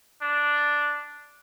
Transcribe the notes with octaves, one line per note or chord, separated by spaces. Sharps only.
D4